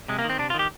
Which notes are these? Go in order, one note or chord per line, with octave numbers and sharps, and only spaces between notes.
C3 G#3
A#3
D#3
C4
C3 D4
F4
D#3
G4